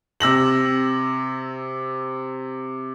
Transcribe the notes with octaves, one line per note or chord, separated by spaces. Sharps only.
C3 E6 A#6 F#7